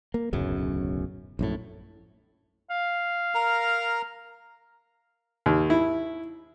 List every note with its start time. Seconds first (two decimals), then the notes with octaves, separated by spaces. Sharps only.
0.14 A#3
0.33 D1 B1 F#2 C#3
1.39 A#1 F#2 A2
2.70 F5
3.35 A#4 A#5
5.46 D#2
5.70 E4